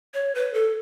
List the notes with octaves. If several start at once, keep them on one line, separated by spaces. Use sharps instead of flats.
C#5
B4
A4